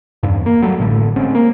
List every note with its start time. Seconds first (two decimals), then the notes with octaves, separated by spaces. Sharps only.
0.23 E2 G2
0.46 A#3
0.62 F#3 G3 A3
0.78 A1 A2 D3 A3
1.16 G#3 C4 C#4
1.35 A#3